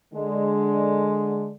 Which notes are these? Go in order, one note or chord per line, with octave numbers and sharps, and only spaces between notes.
D3 G#3